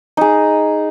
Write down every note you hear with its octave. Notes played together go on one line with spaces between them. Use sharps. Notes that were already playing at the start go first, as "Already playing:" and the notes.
D#4 G#4